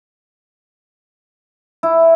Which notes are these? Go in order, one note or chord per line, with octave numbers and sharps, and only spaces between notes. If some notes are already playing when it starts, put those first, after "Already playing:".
E4